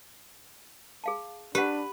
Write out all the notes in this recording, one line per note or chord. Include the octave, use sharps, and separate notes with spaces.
G#4 F5 A5
D4 G4 B4 F#5